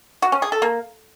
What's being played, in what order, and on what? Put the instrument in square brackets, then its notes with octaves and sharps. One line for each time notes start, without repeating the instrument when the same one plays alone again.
[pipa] F#4
C#4
G#4
A4
A#3